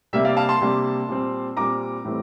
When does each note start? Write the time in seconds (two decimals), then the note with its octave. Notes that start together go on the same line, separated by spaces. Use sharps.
0.13 C3 G3 A#3 D4 E5
0.25 D5 F5
0.37 F5 A5
0.49 A5 C6
0.61 C3 G3 A#3 D4
1.09 A#2 G3 C4
1.57 A#2 G3 C4 A#5 D6
2.05 A2 E3 G3 C4